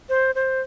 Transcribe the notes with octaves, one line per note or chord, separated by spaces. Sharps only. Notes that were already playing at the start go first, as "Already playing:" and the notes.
C5
C5